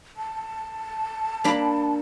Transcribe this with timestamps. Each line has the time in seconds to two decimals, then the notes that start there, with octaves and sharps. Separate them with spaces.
0.17 A5
1.44 A#3 D4 B5